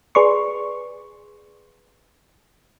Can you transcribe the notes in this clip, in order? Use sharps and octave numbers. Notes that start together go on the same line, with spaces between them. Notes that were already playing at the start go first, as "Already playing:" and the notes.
G#4 B4 D5 C6 C#6